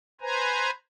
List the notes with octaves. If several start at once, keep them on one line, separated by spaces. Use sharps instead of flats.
B4 C5 G#5 A#5